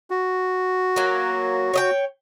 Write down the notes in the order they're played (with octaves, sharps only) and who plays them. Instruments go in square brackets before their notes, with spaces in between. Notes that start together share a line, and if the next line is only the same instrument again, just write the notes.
[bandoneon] F#4
[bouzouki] F#3 A#3
C#5 D#5 G5